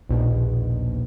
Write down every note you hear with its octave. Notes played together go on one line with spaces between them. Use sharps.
A#1 D#2 B2